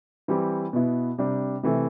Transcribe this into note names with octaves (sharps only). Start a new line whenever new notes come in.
E3 G3 C4 G4
B2 B3 E4
C3 G3 D4
C3 E3 A3